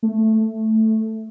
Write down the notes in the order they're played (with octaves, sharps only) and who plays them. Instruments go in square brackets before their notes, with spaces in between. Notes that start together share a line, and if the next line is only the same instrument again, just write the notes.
[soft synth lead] A3